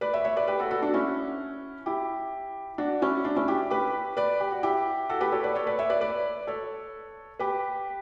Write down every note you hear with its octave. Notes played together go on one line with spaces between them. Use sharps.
B4 D5
C#5 E5
C#5 E5
B4 D5
G4 B4
F#4 A4
F#4 A4
D4 F#4
C#4 E4
E4 G4
D4 F#4
C#4 E4
D4
C#4 E4
E4 G4
G4 B4
B4 D5
G4
F#4
E4 G4
F#4 A4
G4 B4
A4 C#5
B4 D5
A4 C#5
B4 D5
C#5 E5
B4 D5
B4 D5
A4 C#5
G4 B4